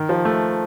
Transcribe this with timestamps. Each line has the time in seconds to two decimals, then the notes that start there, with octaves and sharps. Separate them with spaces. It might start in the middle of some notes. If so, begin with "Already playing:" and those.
Already playing: D#3
0.09 F3
0.25 A3